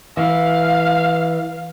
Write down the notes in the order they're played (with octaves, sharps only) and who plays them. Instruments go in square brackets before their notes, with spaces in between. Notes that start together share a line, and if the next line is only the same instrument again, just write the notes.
[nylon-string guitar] E3 [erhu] F5